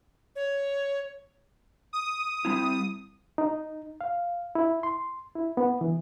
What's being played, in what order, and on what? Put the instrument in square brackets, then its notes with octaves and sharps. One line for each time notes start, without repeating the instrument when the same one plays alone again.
[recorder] C#5
[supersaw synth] D#6
[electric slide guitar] G3 C4 E4
[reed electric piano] D#4
F5
E4
C6
E4
B3
E3